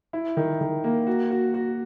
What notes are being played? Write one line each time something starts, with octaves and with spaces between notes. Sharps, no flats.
E4
D#3
D#3
A#3
F#4
F#4
F#4